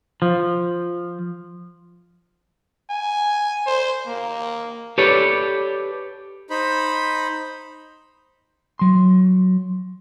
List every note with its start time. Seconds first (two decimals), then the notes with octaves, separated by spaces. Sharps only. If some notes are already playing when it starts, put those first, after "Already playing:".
0.22 F3
2.90 G#5
3.66 C5
4.07 A#3
4.98 G4 A4 B4 C#5 D5
6.50 D#4 C5 B5
8.79 F#3 C6